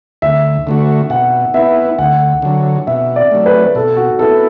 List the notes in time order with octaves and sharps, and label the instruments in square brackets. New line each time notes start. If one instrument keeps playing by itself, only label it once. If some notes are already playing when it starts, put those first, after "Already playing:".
[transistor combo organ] D2 [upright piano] E5
[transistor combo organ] D3 A3 F#4
[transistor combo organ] B2 [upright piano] F#5
[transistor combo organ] B3 E4 [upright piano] E5
[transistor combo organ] D2 [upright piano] F#5
[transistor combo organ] D3 F#3
[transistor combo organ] B2 [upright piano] E5
[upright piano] D5
[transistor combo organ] F#3 A3
[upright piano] B4
B4
[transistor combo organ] B2 [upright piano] A4
[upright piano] F#4
[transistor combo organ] B3 E4 [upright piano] A4